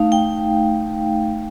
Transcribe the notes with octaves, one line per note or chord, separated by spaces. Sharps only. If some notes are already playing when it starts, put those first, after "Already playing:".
Already playing: A3 D#4 F5
G5